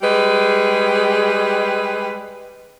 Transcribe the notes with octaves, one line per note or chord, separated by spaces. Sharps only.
G3 G#3 G#4 B4